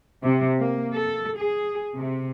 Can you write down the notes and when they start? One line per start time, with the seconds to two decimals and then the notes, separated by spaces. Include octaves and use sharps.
0.23 C3
0.58 A#3
0.93 A4
1.37 G#4
1.95 C3